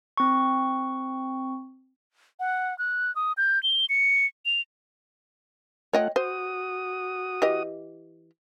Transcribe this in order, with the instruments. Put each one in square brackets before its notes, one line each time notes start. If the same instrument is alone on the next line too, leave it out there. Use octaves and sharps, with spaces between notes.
[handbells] C4 C#6
[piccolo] F#5
F#6
D#6
G6
G7
C#7
F7
[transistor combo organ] A3 F4 F#5 [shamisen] C#5 D#5 G5
[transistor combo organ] F#4 D#6 [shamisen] C5
[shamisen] E3 G4 D#5